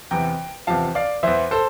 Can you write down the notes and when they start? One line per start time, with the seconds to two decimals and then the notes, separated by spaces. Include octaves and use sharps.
0.11 E2 C3 E3 G5 A#5
0.67 E2 C3 F3 F5 A5
0.95 D5 F5
1.23 E2 E3 C5 E5
1.51 A4 C5